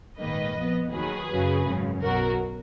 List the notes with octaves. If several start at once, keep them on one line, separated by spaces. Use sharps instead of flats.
A#1 G#2 D#3 A#3 B4 D#5
F2 F3 B3
D#2 D#3 F#3 G#4 B4
F#2 C#3 F#3
G#1 F#2 C#3
B1 B2 F#3 F#4 A#4